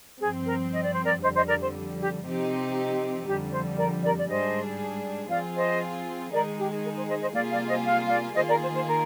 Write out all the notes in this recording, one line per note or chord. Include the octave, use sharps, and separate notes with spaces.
G2 F3 C4 G#4
A#4
D#5
D5
C5
A#4 D5
F2 D3 G3 C5 D#5
C5 D#5
A#4 D5
C5
G4
C3 F3 C4 D#4 G4
F2 D3 G3 G4
C5
A#4 D5
A#4 D5
D5
G#2 G3 D4 G#4 C5 D#5
F3 C4 F4 G#4 D5 F5
C5 D#5
D#3 G#3 D#4 G#4 A#4 D5
G4
A#4
C5
C5 D#5
C5 D#5
C3 G3 A#3 F4 G#4 D5 F5
D5 F5
C5 D#5
F5
D5 F5
D#3 A#3 F4 G#4 C5 D#5
A#4 D5
C5
C5
A#4